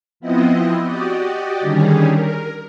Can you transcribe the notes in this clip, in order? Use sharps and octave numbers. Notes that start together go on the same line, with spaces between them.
F3 B3 C4 E4 D#5
F#4 G4 D5 D#5
D3 D#3 G3 C#4 G4 G#4
A#4